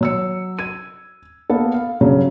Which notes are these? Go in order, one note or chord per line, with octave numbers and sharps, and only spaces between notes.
F#3 E6 C#7
G#6 D#7
A#3 B3 A4
F5
G2 C#3 F#3